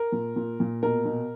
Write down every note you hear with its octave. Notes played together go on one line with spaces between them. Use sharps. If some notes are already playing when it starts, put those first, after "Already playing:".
Already playing: A#4
A#2
A#2
A#2
B2 A#4
B2